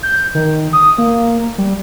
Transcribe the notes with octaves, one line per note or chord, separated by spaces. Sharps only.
G6
D#3
D#6
A#3
G3